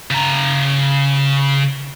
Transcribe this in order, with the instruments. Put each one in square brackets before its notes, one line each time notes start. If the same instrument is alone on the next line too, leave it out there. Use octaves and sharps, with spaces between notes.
[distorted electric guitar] C#3 A#5